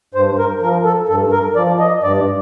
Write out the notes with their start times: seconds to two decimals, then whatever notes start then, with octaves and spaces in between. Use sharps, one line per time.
0.14 G2 C5
0.38 A#4
0.62 F3 A#4
0.85 A4
1.09 G2 A4
1.32 A#4
1.56 F3 D5
1.80 D#5
2.03 G2 D5